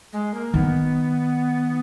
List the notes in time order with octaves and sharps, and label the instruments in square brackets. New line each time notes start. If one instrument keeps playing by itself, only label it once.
[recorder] G#3
A#3
[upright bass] D#3 [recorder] B3